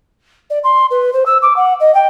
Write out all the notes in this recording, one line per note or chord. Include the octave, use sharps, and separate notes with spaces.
D5
C6
B4
C5
E6
D6
F#5
D#5
G5